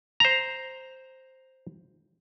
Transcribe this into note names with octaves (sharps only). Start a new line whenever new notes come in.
C5 A#5